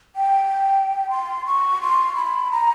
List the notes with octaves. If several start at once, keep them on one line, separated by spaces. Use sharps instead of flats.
G5
C6
C#6
C6
B5
A#5